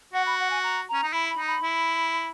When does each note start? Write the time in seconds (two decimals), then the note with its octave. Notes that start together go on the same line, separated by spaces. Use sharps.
0.13 F#4 F#5
0.26 B5
0.40 F#5
0.51 G#5
0.63 A#5
0.89 C#4 A#5
1.03 D#4
1.13 E4 B5
1.30 B5
1.38 D#4
1.47 B5
1.63 E4